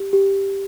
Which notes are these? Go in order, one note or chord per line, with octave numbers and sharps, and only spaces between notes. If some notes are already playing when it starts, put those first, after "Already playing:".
Already playing: G4
G4